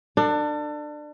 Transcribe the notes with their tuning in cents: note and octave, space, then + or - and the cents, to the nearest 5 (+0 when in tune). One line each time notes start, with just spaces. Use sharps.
D4 +25 A4 +40